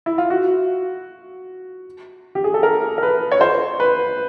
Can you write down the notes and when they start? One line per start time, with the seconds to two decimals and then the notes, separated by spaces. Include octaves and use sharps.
0.06 E4
0.18 F4
0.30 F#4
2.35 G4
2.44 G#4
2.54 A4
2.63 A#4
2.98 A#4
3.03 B4
3.32 C#5
3.41 C5
3.80 B4